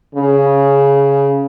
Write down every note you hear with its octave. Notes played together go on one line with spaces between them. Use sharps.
C#3